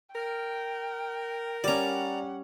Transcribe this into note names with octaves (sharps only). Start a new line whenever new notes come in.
A#4 G5
G3 C#4 D5 F#5 A#5